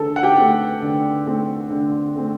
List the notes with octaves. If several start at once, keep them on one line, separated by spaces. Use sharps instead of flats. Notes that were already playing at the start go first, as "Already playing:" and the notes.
Already playing: D3 A4 A5
F#5
G4 G5
A3 C4
D3
A3 C4
D3
A3 C4